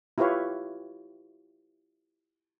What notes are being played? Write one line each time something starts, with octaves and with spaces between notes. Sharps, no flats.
E4 F4 G4 B4 C#5 F5